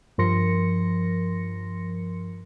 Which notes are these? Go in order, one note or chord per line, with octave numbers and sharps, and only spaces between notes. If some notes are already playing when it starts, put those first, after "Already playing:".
G2 F3 A#4 C6 A#6 C#7